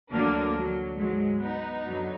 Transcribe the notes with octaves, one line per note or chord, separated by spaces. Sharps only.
D2 D3 F#3 A#3 D4
F#3
G#2 F#3 G#3
B3 D#4
F#2 D3 F#3